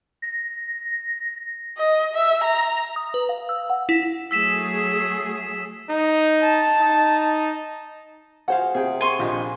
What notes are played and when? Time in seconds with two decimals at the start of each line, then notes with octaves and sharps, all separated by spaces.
0.22 A#6
1.77 D#5
2.15 E5
2.44 A#5
2.96 D#6
3.14 B4
3.29 F5
3.49 E6
3.70 F#5
3.89 E4
4.31 F#3 A3 G#4 E6 B6 E7
5.90 D#4
6.41 A5
6.80 D#4
8.48 F#4 G#4 C5 F5 F#5
8.75 C3 G#4 G5
9.01 G#5 C6 C#6
9.19 A#1 F4 G4 D#5